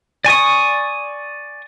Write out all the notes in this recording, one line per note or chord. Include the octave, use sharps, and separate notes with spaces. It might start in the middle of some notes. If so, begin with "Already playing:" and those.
D5 G#5 C#6 D#6